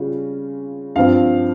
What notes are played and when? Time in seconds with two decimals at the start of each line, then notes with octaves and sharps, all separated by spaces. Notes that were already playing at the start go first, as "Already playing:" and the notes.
Already playing: C#3 G3 C#4 F4
0.96 G2 F3 C4 F5